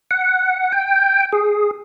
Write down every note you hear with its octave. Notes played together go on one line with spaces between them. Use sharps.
F#5
G5
G#4